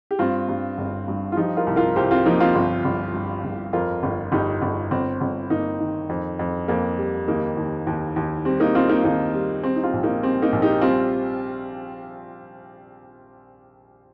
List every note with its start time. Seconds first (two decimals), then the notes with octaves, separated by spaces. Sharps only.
0.11 G4
0.19 G2 C4 F4
0.49 G2
0.78 G1
1.08 G2
1.32 F4
1.37 F3 D#4 G4
1.57 F4 A#4
1.67 C2
1.76 F4 A#4
1.96 C2 G4 C5
2.11 C4 F4
2.26 F3 A#3 D#4
2.40 C4 F4
2.55 G1
2.85 G1
3.14 G2
3.44 G1
3.73 F2 F4 A#4
4.03 G1
4.32 G1 D#4 G4
4.62 G1
4.91 G1 C4
5.21 G1
5.50 G1 A#3 D#4
5.80 D#3
6.09 F2
6.39 F2
6.68 F2 A#3
6.98 G3
7.28 D#2 A#3 D#4
7.57 D#2
7.87 D#2
8.16 D#2
8.45 G3 C4
8.60 A#3 D#4
8.75 G3 C4 F4
8.89 A#3 D#4
9.04 D#2 A#3 D#4
9.34 G3
9.63 G3 C4
9.76 D#4
9.84 C4 F4
9.93 A#1
10.03 A#3 D#4
10.23 G3 C4
10.42 A#3 D#4
10.52 A#1
10.62 D#4 G4
10.81 G3 C4 F4